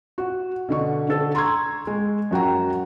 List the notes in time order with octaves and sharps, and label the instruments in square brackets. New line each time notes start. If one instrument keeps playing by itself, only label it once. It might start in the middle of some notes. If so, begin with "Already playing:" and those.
[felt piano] F#4
B2 D3 C#6
D3 A4
A#5 C6 C#6 E6 G#6
G#3
F#2 F#4 G5 A#5